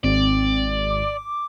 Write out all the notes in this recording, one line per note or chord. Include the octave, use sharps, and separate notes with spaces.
G#1 C4 D5
D6